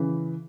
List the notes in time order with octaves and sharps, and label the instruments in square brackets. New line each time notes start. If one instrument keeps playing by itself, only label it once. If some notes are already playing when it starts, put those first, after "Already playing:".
Already playing: [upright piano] C#3 E3